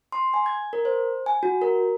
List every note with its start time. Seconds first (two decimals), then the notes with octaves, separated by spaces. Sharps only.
0.12 C6
0.34 G#5
0.46 G#6
0.73 A#4
0.85 C5
1.26 G#5
1.43 F#4
1.62 A#4